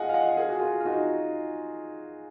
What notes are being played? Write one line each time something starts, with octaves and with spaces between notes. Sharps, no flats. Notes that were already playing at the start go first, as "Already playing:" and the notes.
Already playing: F4 G#4 D#5 F#5 G#5
F5
D#5 F#5
G#4
F#4
F4 G#4
F4
D#4 F#4